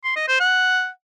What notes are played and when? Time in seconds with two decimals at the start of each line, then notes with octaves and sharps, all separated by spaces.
0.04 C6
0.16 D#5
0.28 C5
0.40 F#5